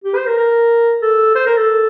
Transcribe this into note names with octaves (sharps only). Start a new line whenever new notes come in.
G4
C5
A#4
A#4
A4
C5
A#4
A4